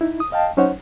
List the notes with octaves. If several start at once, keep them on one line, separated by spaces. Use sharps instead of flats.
D#4 E4
D#6
D#5 F5 G5 A5
F#3 C#4 D#4 C5 C#5 F#5